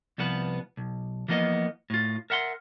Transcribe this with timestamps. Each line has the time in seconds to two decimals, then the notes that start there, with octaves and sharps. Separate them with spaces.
0.18 C2 F3 B3 B4
0.77 B1
1.28 E3 F3 A#3 B3 D#5
1.90 A2 F4
2.30 A#4 E5 F#5 B5 C6